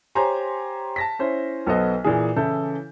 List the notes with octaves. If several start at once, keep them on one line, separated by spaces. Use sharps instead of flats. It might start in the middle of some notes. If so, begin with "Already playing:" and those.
G4 C5 C#5 G#5 A#5 C6
A5 A#6 B6
C#4 E4 C5
B1 B3 A4 C5 D#5
A#2 E3 G#4
C#3 E3 E4 A4 G6